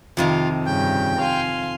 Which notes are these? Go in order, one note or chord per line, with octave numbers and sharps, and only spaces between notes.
F2 C3 D#3 F4
G2 C#3 G5
F5 G#5 C6